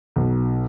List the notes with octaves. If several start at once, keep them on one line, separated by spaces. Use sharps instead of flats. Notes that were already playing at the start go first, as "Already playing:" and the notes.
B1